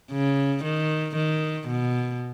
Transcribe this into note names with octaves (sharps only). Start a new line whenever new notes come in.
C#3
D#3
D#3
B2